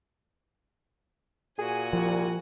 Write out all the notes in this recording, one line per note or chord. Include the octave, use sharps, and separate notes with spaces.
A#2 F#4 G#4 G#5
C2 F3